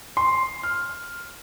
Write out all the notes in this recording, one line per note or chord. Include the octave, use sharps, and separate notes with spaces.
C6
F6